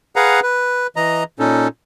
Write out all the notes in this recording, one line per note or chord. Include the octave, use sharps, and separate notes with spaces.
G#4 B4 F5 F#5 A#5
B4
E3 D#5 A#5
A#2 C#4 D#4 A4